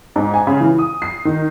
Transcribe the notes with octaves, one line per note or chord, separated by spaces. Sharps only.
G#2
G#5
C#3
E3
D#6
C7
D#3